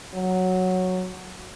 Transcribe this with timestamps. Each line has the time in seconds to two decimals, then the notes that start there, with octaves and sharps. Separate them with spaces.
0.14 F#3